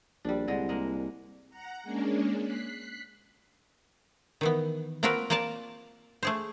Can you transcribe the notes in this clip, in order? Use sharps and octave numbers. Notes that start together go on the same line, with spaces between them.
A#1 G3 D4
C2 D3 G#3
G#3 A#3
F#5 A#5
G#3 A#3 C#4 D4
F#6 B6 C7
D#3 E3 B3
A#3 C4 F4 F#4 A#4 B4
A#3 F4 A#4 D5 A5
A3 G#4 C5